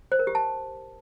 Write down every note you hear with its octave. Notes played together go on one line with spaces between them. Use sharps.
C5
A#4
G4
A5